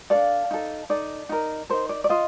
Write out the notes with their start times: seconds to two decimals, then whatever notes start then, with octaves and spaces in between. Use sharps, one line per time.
0.10 D4 A4 D5 F5
0.51 D#4 A4
0.90 D#4 A4 D5
1.29 D#4 A#4
1.70 D#4 A#4 C5
1.89 D5
2.04 D5
2.09 F4 C5 D#5